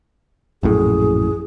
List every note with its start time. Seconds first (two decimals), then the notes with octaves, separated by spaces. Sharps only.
0.63 A#1 F#2 A2 G#4